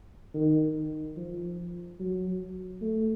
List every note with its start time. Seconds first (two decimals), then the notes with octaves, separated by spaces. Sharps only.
0.34 D#3
1.17 F3
1.99 F#3
2.81 A3